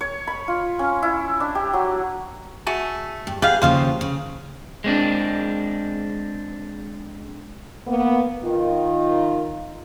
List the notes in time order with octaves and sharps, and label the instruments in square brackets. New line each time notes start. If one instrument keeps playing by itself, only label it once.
[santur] C#5
B5
F4
C#4
E4
D4
G4
F#3
[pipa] A3 F#4 G#4
[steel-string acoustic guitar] G2
[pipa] B3 G4 F5 [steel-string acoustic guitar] G#4
[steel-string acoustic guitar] D#2 C#3 F3 [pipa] C5 F5
[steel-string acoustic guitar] C#3
[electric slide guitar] G#3 C4 D4
[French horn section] A#3 B3
D#3 F4